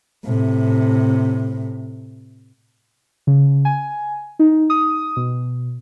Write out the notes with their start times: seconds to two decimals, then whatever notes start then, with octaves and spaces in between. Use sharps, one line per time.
0.25 A2 C3
3.27 C#3
3.65 G#5
4.39 D#4
4.70 D#6
5.17 B2